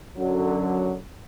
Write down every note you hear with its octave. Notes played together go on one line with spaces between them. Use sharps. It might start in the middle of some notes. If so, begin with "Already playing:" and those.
F#2 D3 F#3